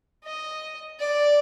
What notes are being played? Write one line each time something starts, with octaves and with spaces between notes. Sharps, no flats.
D#5
D5